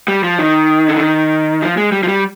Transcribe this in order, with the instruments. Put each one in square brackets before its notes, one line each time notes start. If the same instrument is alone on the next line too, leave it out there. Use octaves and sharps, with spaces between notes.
[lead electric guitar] G3
F3
D#3
D3
D#3
F3
G#3
G3
F3
G3